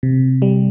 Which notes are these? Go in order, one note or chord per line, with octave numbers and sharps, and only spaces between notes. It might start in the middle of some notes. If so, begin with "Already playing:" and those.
C3
G3